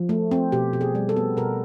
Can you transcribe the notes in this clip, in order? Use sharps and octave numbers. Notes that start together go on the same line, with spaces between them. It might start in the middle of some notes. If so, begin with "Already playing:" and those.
Already playing: F3
A3
C4
B2 G4
B2
G#4
G3
A4
B3
B2 A#4